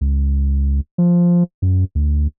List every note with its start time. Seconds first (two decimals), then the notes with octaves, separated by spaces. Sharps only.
0.01 C#2
0.98 F3
1.62 F#2
1.95 D2